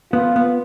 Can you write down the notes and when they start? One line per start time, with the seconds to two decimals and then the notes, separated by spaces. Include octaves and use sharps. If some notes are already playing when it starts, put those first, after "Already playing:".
0.13 B3 F4
0.36 B3